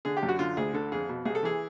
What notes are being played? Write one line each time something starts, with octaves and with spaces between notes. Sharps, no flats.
D3 G#4
G4
F#2
F#4
D3 F4
D2 G#4
D3 A4
F2 G#4
B2
C2 G#4
A4
E3 G#4